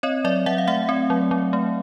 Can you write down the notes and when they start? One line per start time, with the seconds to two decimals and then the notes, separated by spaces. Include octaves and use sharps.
0.03 C4 C#5 D#5
0.25 F#3 D5 E5
0.46 F#3 E5 F#5
0.58 F5
0.67 A3 E5 F#5
0.89 C4
1.10 F#3
1.31 F#3
1.53 A3